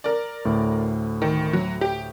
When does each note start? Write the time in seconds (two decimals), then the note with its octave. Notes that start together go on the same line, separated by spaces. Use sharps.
0.04 A#4 D5
0.45 D2 A2
1.22 D#3
1.53 F#3
1.81 G4